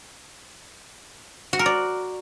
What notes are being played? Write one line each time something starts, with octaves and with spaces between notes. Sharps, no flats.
F#4
A#4
D5